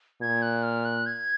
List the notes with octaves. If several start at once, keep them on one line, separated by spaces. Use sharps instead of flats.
A#2 G#6
F#6
F6
F#6
G#6